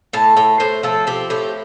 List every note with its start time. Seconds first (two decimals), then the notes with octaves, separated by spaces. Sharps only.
0.13 A2 A5
0.37 A2 G5
0.60 A2 C5
0.83 F3 A4
1.07 C4 G4
1.30 A2 G4